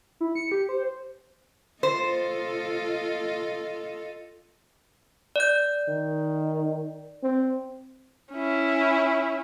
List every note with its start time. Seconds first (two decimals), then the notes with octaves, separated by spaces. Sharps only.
0.21 E4
0.35 C#7
0.52 G4
0.69 C5
1.83 F4 A4 C5 D#5
5.36 D5 G6
5.88 D#3
7.23 C4
8.32 C#4 E4